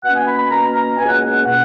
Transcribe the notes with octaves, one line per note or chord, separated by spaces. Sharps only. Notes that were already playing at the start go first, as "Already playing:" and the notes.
B2 A#3 C#4 F#5
G#5
B5
B5
B2 A#3 C#4 A#5
A#5
C#2 B2 A#3 C#4 G#5
F#5
F#5
B2 A#3 C#4 F#5